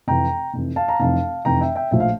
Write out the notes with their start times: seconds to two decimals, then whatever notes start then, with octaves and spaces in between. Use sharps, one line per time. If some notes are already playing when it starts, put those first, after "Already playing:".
0.07 F1 F2 E3 G5 A#5
0.53 F1 F2 E3
0.76 F5 A5
0.88 A#5
0.99 F1 F2 E3 F5 A5
1.45 F1 F2 E3 G5 A#5
1.61 E5 G5
1.76 E5 G5
1.91 A#1 A2 F3 E5
2.00 F5